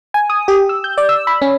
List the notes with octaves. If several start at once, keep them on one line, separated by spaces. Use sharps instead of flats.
G#5
D#6
G4
E6
G6
D5
E6
B5
C#4